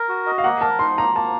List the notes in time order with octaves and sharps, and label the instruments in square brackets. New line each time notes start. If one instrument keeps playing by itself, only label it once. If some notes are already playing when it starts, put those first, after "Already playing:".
Already playing: [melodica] A#4
F#4
D#5
[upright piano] F5
[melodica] A#3 [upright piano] F#5
[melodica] A#4 [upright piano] A5
[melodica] D#4 [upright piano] C6
[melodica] A#3 [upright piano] A#5
[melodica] A#3 [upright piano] A5